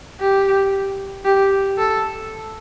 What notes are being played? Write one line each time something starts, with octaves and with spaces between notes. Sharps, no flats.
G4
G4
A4